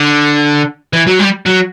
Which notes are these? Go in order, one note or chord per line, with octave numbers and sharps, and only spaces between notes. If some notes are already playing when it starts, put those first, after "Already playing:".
Already playing: D3
E3
F#3
G3
F#3